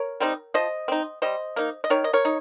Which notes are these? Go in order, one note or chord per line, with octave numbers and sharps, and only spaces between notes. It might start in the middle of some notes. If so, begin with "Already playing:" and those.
Already playing: A#4 C#5
G3 C4 D#4
F3 C5 D#5
C4 D#4
G3 C5 D#5
A#3 D#4
D#5
D#3 A#4 C#5
D#5
A#4 C#5
D#4